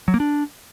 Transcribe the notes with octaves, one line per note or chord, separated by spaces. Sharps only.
F#3
A#3
D4